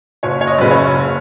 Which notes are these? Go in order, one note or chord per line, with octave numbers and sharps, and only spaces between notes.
F#1 C#5
C#5
D#5
F#2 C#3 B4
C#5
F#1